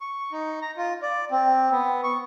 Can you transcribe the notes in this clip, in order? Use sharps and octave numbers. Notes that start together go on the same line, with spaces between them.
C#6
D#4
A#5
F4
D5
C4
B3
C#6